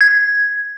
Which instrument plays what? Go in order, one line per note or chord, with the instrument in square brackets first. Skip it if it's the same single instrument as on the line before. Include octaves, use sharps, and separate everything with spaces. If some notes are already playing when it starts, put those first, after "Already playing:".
[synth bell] G#6